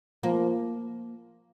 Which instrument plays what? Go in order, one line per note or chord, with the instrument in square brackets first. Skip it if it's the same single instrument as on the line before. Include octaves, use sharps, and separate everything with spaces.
[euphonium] F3 [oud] A#3